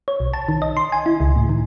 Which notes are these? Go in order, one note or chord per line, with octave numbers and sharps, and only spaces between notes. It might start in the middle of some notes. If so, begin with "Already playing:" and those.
C#5
B1
A5
D#3
D#5
C6
G#5
E4
C#2
A2
D#3